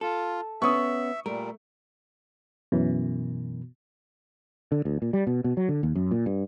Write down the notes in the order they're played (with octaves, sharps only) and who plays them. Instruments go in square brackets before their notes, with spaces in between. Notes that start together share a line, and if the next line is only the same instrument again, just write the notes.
[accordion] F4 [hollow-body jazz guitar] A4
[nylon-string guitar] B3 C#4 [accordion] E5 [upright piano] C#6 D#6
[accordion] A#2 G3 [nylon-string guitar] A3 [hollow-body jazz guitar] A#4
[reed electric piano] F#2 E3 [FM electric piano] B2
[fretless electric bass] D3
D2
A#2
G3
B2
B2
F#3
D3
D#2
F#2
A#2
G2